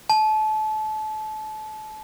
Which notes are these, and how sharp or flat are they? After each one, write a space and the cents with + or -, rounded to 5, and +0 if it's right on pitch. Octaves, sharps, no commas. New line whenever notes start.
A5 -30